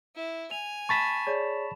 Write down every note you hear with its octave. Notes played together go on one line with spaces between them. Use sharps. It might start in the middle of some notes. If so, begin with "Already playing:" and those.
E4
G#5 F7
A5 B5 C#6 A6 B6 E7
G#4 C#5 D5